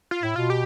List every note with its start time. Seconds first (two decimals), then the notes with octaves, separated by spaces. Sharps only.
0.11 F4
0.23 A2 E4
0.36 B2 F4
0.50 G4